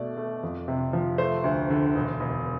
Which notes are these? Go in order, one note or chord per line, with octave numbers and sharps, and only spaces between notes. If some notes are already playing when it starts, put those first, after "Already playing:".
Already playing: B2 A3 D5
A3
F2
C3
F3
A3 C5
D2
D3
E1
E1